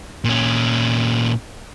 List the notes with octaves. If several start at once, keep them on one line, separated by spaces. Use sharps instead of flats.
A#2 C#4